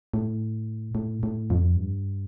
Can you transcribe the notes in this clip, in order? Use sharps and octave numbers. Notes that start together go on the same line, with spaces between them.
A2
A2
A2
F2
G2